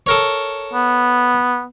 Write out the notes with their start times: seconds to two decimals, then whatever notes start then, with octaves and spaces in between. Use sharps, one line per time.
0.07 A4 A#4 C#5
0.73 B3